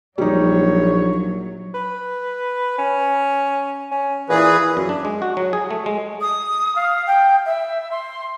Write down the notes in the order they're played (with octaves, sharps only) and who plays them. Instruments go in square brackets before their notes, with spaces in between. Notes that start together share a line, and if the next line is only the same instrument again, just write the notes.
[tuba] A#1 [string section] F#3 [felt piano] G3 D#4 [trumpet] C#5
[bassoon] B4
C#4
C#4
[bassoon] A#2 [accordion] E3 G#4 B4
[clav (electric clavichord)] F#2
D4
G#3
F#4
F#3
G#4
A3
G#3
[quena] D#6
F5
G5
E5
C6